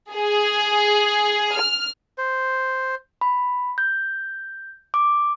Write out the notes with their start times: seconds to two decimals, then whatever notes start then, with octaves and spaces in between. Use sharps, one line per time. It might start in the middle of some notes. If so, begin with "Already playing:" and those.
0.12 G#4
1.57 F6
2.18 C5
3.21 B5
3.78 G6
4.94 D6